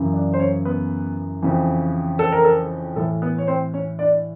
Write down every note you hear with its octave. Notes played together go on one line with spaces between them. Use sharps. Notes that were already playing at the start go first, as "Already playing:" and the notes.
Already playing: F#2 C#3 E3
D4 D5
C5
C#4 C#5
B3 B4
F2 C#3 E3
A4
A#4
A4
A2 E3 A4
B3 B4
C#5
C4 C5
C#4 C#5
D4 D5